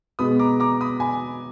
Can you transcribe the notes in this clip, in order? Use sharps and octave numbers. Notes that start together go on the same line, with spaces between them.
B2 G#3 B3 B5 D#6
A#5 D6
A#5 D6
B5 D#6
G#5 B5